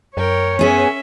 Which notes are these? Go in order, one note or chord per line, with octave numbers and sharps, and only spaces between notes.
F#2 A#4 C#5 G5
B3 C#4 G#4 E5